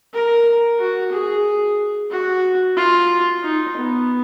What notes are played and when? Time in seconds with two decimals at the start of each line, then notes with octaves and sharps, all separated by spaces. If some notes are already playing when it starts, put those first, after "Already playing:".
0.14 A#4
0.79 F#4
1.12 G#4
2.11 F#4
2.77 F4
3.44 D#4
3.77 B3